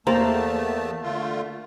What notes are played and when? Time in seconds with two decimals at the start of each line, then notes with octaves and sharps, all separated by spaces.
0.07 E2 A3 A#3 G4 C5 A5 A#5
1.02 D3 A3 F4